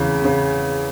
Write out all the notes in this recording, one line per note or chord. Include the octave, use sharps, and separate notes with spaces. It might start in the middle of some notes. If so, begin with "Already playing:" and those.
Already playing: E2 C#3
C#3